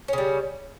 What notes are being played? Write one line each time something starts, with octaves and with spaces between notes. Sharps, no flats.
C#3 G3 C#4